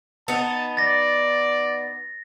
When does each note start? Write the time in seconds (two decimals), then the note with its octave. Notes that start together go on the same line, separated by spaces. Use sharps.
0.28 B3 D#4 A5
0.77 D5 A6 A#6